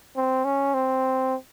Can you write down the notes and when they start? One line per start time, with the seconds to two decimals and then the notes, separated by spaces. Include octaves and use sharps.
0.16 C4
0.45 C#4
0.74 C4